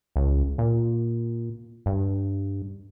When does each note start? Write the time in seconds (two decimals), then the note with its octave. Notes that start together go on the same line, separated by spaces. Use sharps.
0.16 C#2
0.58 A#2
1.86 G2